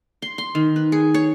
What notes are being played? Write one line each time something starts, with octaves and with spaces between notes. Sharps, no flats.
C6
C6
D#3
B4
G#4
C#5